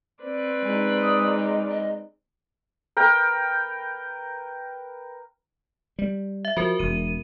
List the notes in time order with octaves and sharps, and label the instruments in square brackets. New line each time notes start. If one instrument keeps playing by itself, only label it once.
[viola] C4 B4 [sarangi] D5
[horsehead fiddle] G#3 D#4
[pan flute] D#6
D#5
D#5
[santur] A#4 B4 G5
[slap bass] G3
[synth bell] E5
[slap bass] F3 [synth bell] F#4 A#4
[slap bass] E1 [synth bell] D#7